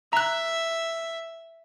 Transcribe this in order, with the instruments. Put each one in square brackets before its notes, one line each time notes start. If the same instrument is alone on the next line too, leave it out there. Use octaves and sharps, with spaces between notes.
[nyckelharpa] E5 [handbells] A#5 F#6